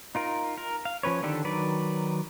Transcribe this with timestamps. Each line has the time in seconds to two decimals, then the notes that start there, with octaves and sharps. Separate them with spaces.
0.15 D#4 F4 A#4
0.58 A#4
0.85 F5
1.03 F3 C#4 B4 C#5
1.23 D3 D#3 D4 G4 A4
1.44 D#3 F#3 B4 D5